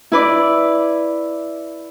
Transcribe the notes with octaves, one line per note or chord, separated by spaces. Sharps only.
E4 B4 D5